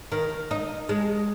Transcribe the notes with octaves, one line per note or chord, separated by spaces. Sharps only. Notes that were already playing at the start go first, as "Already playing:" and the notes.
D#3
D#4
G#3